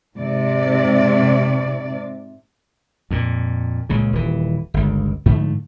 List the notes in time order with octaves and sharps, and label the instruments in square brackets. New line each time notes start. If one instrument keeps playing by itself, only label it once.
[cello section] G#2 C3 D5
[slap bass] F2 A#2
C#2 A#2 C#3
D#1 E3
G1 C#2
G#2 D3 F3 A3